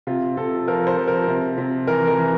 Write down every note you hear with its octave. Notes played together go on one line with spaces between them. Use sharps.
C3 F4
C3 A4
F3 A#4
C5
F3
A#4
C3
C3
E3 A#4
A#4
E3